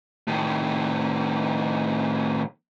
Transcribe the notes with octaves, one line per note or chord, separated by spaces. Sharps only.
A2 D#3